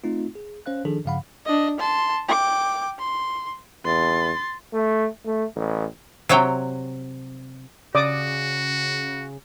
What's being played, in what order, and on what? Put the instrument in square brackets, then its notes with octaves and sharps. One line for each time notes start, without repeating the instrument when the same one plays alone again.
[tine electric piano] A3 C4 D#4 F4
G#4
C#4 C5 F5 F#6
D#3 F3 D4 G#4 A4
G2 C#3 F3 F5 F#5 B5
[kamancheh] D4 D#5
A5 C6
G5 D6
C6
[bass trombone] E2 [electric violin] C6 A6
[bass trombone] A3
A3
A1
[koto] C3 F#3 C#5 G5
[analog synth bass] C#3 [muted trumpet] F#4 [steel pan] D5 D6 D#6